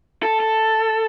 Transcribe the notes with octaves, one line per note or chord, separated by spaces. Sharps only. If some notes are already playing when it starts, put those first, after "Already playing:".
A4
A4